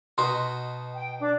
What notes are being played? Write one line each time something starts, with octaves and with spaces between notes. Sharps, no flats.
B2 D#4 F#4 C6
G5
D4 D6